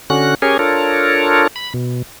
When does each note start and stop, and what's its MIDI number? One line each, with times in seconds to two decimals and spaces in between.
0.10 0.35 50
0.10 0.35 61
0.10 0.35 66
0.10 0.35 90
0.42 0.57 61
0.42 0.57 67
0.42 0.57 68
0.42 0.57 70
0.42 0.57 73
0.42 0.57 80
0.59 1.47 62
0.59 1.47 65
0.59 1.47 69
0.59 1.47 70
0.59 1.47 73
1.56 1.73 83
1.74 2.02 47